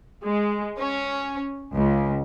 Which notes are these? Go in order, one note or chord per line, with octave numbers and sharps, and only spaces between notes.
G#3
C#4
C#2